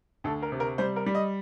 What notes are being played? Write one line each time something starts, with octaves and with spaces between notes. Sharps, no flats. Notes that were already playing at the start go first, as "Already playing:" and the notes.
D2 A4
A#4
C3
A#4
G3 C5
A#4
G3
D#5